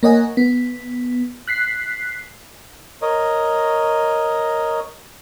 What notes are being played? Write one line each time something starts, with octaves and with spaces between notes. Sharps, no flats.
A#3 A#4 C#5 D#5 F#5 G#5
B3
F#6 B6 C7
A#4 C#5 D#5